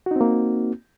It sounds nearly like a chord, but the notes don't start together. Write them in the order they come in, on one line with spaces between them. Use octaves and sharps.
F#4 D#4 C4 A#3